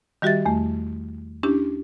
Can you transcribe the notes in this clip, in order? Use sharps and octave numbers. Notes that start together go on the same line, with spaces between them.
D#3 G3 F#4 G4 E5 A6
E2 A3
C#4 D4 E4 G4